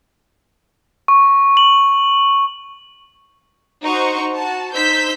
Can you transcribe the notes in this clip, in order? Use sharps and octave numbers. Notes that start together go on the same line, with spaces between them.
C#6
F#7
D#4 F#4 C5 C#6
F#4 A5
D#4 C5 E6 G6 B6